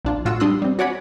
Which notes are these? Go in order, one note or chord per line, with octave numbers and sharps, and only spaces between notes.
A#1 D4 F4
A2 F4 F#4 E6
G3 D4 C6 D#6 E6 F#6
G3 C4
F#4 C#5 D5 F#5 G#5 B5